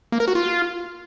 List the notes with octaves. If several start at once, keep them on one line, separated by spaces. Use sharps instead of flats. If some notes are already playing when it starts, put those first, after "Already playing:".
A#3
A#4
F#4
F4